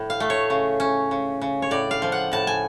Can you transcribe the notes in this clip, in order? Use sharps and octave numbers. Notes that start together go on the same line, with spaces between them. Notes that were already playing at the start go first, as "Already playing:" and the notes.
Already playing: A2 F3
F5
A3
C#5
C#3
C#4
C#3
C#3
C#5
A2 D5
F5
F3
F#5
A2 A5
G#5